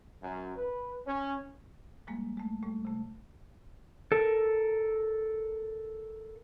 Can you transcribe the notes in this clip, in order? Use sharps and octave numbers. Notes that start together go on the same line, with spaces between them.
F#2
B4
C#4
F3 G3 G#3 A#3
G#3 A3
A2 G3 A3
C3 A3
A4 A#4